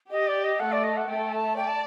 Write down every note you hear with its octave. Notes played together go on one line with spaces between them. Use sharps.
G4 D#5
D5
D#5
A3 A4 F#5
D5
D#5
F#5
A3 A4 G5
A5
D5 G5
A5